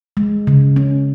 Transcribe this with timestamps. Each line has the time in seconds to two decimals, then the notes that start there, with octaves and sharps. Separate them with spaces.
0.17 G#3
0.47 C#3
0.76 C#4